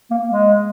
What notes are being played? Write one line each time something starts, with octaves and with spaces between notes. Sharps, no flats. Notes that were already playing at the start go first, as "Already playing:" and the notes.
A#3
G#3